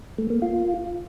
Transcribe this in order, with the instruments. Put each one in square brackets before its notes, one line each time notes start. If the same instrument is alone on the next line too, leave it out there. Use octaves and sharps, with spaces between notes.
[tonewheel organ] A3
A#3
F4